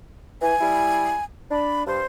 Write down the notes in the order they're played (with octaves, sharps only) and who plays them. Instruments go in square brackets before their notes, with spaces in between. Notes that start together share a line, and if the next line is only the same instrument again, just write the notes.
[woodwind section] E3 [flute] G#5
[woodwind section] G3 E4
[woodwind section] D4 [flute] B5
[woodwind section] G2 [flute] C5